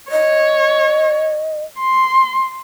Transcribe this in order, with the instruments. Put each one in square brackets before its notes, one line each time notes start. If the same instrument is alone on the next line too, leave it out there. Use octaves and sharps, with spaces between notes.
[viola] C#5 [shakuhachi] D#5
[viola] C6